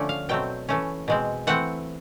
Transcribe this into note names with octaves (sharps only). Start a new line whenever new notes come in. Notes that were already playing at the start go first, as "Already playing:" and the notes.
Already playing: D3 F3 A3 C#4 D5
F5
B2 F#3 A3 C4 G5
E3 A3 C#4
B2 G#3 C4
E3 A3 C4 F#5